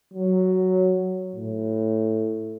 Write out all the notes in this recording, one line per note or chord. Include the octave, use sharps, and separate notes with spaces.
F#3
A2